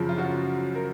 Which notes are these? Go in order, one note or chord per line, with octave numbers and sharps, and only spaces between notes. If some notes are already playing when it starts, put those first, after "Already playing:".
Already playing: F#2 C#3 F3
F4
F#4
A#4